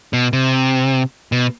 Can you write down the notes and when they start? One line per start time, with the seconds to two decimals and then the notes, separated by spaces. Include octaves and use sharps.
0.13 B2
0.33 C3
1.32 B2